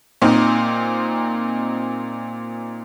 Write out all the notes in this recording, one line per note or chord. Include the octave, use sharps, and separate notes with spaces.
A#2 C4 D#4